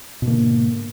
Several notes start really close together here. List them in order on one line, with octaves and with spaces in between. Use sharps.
B2 G#2 A#3 D3